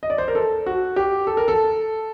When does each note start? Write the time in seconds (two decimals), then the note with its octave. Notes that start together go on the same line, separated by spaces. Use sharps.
0.03 D#5
0.10 D5
0.18 C5
0.28 A#4
0.35 A4
0.66 F#4
0.96 G4
1.27 A4
1.37 A#4
1.48 A4